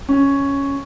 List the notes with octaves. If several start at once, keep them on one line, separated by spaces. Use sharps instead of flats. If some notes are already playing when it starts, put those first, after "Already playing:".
C#4